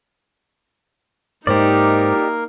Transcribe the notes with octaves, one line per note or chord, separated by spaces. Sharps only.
G#2 A#3 D#4 G4 A#4 C5 D5